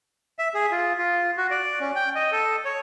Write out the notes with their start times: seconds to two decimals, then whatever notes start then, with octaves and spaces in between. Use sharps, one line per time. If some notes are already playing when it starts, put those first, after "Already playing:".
0.39 E5
0.54 G#4
0.72 F4
0.98 F4
1.37 F#4
1.51 D5
1.80 C#4
1.95 G5
2.15 D#5
2.32 A4
2.65 C#5